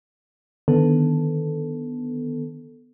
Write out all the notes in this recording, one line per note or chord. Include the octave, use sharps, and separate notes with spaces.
D3 D#3 B3 A4